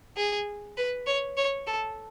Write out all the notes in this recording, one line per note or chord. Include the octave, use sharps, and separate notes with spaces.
G#4
B4
C#5
C#5
A4